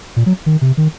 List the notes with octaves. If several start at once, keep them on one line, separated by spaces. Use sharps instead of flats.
A#2
F#3
D#3
C3
D#3